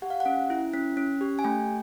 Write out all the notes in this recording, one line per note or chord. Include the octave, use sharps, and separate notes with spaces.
G4 F#5
F5
F#5
C#4
E4
C#4
C#4
G4
G#5
A3 G5